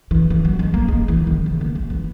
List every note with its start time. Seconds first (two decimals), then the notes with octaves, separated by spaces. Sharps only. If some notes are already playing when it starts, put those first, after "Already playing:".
0.11 E3
0.30 E3
0.45 F#3
0.59 G#3
0.74 A#3
0.88 G#3
1.08 E3
1.27 D#3
1.46 C#3
1.61 A#3
1.75 G#3
1.90 E3